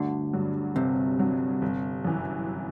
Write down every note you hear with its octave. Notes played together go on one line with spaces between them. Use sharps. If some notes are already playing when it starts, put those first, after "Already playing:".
Already playing: G1 D2 D3
G2 F#3
G1 C3
G2 F#3
G1
F#2 E3